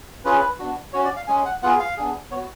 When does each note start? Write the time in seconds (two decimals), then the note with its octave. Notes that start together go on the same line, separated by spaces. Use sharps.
0.25 C#4 F4 G#4 B4
0.59 B3 D4 F#4
0.93 C#4 F#4 C#5
1.05 D5
1.16 F5
1.27 G#3 C#4 G#4 G#5
1.45 F#5
1.62 B3 F4 G#4 F#5
1.79 F5
1.97 B3 D4 G#4
2.31 B3 C#5
2.36 F#4